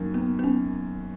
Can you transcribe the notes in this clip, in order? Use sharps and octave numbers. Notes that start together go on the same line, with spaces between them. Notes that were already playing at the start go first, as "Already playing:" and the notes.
Already playing: F#2 D#3 A#3
B3
B3
C#4